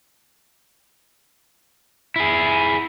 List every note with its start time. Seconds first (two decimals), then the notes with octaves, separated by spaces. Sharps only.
2.16 E4 G#4